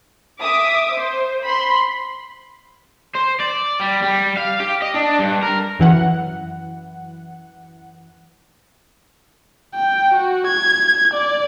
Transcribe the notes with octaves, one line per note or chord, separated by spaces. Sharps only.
E5 D6 D#6
C5
B5 C6
C5
D5
G3
G3
F5
G4
D#5
D4
G2
A#4
F#2 E3 F#5
G5
F#4
G#6
D5